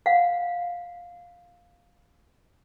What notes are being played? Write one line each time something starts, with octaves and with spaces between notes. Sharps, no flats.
F5 F#5